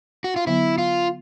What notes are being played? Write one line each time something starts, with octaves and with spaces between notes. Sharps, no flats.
F#4
F4
D3 F#3 B3 E4
F4